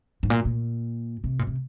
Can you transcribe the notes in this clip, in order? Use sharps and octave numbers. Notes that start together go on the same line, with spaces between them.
G#2
A#2
A#2
C3
A#2
C3